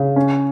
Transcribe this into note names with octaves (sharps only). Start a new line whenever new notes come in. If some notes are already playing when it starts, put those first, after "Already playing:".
Already playing: C#3
C#4